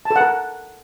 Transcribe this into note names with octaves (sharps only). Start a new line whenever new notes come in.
A5
A4
F#5
A#4